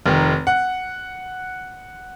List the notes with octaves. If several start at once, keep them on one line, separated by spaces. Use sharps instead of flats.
F1 D#3
F#5